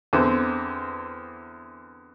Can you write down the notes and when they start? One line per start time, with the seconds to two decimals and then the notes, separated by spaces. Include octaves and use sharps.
0.13 E2 D3 C4